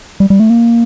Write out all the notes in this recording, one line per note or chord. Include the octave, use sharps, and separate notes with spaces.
G3
G3
A3
A#3